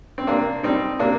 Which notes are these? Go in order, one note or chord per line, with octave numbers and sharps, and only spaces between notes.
C4
C3 A#3 D4
G3 C4 D#4
C3 A#3 D4